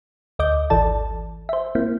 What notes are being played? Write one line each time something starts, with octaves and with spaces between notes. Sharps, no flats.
D2 D#5 D6 G6
G#1 E3 A4 D5 A5
C5 E5
A#3 C4 E4